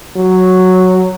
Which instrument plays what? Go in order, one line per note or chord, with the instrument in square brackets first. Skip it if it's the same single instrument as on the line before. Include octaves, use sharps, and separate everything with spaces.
[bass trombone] F#3